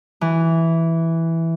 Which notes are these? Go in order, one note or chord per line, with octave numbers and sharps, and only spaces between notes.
E3